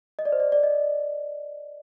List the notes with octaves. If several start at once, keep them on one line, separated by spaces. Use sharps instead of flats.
D#5
D5
C5
D5
D5
D#5